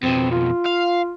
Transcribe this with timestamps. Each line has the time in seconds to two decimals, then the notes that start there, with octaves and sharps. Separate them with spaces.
0.03 F2 B2 C4
0.32 F4
0.66 F5